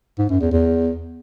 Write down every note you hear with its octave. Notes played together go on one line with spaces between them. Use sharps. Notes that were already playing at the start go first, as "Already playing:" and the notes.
G#2
F#2
E2
E2